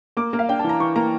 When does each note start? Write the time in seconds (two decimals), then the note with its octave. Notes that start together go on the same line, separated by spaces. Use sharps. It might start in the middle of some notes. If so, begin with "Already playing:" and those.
0.17 A#3 D6
0.33 A#3
0.39 F5
0.48 D4 G5
0.59 E3 A5
0.69 A#5
0.80 E3 C#6
0.96 A#3 A#5